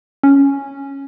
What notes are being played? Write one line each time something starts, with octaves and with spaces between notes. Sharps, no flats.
C#4